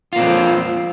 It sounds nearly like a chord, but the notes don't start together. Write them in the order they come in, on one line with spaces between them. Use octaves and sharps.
F4 A#3 C4 F3